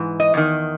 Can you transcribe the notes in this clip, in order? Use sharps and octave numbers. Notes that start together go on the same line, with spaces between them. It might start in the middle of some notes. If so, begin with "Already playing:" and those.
Already playing: G#2 E3
D#5
E2 D#3